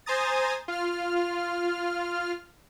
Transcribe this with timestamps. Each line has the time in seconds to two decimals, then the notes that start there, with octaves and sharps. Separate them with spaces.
0.06 C5 G#5 A#5 D#6 A6
0.68 F4 F6